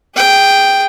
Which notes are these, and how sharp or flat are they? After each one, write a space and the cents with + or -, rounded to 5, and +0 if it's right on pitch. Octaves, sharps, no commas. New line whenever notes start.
G#4 -20 G5 +0